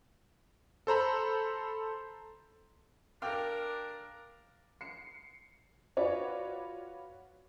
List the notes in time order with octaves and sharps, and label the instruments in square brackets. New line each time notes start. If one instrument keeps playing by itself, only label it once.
[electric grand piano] A4 C5 A#5 B5
[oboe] D4 [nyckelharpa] A#4 [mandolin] F5 [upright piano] G5 D6 F6
[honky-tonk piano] C7 C#7
F4 F#4 B4 C#5 D5